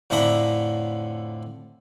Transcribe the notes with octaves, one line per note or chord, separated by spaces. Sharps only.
F2 A2 D3 E5 A#5 B5